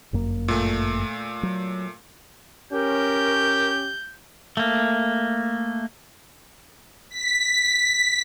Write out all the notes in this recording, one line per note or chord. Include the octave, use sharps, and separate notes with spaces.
G1 F#2 A#3
A#2 A3
F#3
C#4 G4 A#4 G6
A3 A#3
B6